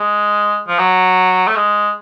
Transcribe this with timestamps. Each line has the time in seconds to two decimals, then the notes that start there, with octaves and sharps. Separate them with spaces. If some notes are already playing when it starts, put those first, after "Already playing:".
Already playing: G#3
0.68 F3
0.79 F#3
1.47 A3
1.56 G#3